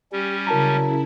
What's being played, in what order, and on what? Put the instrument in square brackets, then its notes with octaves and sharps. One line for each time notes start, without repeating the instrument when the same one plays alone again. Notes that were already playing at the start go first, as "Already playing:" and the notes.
[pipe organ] G3 C#4 [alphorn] G4
[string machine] C#3 E4 [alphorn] F#3 [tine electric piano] A#4 A5 A#5